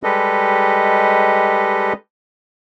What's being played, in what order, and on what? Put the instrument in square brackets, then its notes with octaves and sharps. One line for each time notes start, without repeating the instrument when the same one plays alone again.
[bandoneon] G3 G#3 G4 A4 B4 D#5